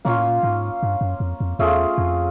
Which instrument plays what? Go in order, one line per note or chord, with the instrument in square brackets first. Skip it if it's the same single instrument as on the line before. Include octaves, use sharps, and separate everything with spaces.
[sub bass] A#2 [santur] A#3 C#4 F4
[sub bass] A2
A#2
G#2
G2
F#2
F2
F2
[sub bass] E2 [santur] A3 C#4 F4 G#4
[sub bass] F2